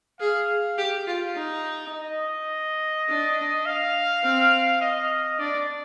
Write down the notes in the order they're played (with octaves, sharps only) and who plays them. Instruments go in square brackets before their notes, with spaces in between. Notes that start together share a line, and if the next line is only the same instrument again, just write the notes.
[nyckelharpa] G#4 [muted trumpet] F5
[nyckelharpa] G4
F4
D#4
[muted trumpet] D#5
[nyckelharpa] D4
[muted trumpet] F5
[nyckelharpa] C4
[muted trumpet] D#5
[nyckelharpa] D4 [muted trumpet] D5